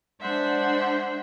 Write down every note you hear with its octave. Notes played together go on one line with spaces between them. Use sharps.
G#3 D4 C5 E5 F#5